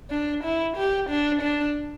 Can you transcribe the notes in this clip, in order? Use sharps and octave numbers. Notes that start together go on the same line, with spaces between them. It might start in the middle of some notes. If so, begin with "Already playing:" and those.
D4
E4
G4
D4
D4